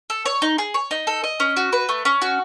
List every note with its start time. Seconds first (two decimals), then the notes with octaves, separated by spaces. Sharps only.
0.10 A4
0.26 C#5
0.42 D#4
0.58 G#4
0.74 C#5
0.91 D#4
1.07 A4
1.24 D#5
1.40 C#4
1.57 F#4
1.73 B4
1.89 A3
2.05 C#4
2.22 F#4